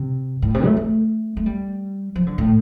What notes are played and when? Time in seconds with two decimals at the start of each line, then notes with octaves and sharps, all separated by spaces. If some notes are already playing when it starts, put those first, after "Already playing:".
Already playing: C3
0.42 A2
0.54 C3
0.65 A3
0.77 A3
1.37 A3
1.46 G3
2.16 F3
2.27 D3
2.38 A2